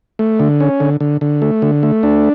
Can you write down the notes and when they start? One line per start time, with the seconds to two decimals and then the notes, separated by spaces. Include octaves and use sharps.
0.19 A3
0.40 D3
0.60 C#4
0.80 D3
1.00 D3
1.21 D3
1.42 A3
1.62 D3
1.83 A3
2.03 D4